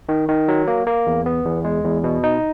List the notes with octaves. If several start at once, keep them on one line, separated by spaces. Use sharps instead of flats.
D#3
D#3
F#3
A#3
A#3
E2
B3
E2
G#3
E2
B2
D#4